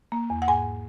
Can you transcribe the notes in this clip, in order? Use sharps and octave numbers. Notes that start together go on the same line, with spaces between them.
A#3
E2
F#5
G#2 G#5